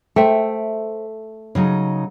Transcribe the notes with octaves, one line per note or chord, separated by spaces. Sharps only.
A3 C5 E5 G5
C#3 F#3 D#4